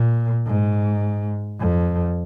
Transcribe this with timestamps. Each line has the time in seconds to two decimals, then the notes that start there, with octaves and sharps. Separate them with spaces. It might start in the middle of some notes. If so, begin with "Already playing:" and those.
Already playing: A#2
0.46 G#2
1.61 F2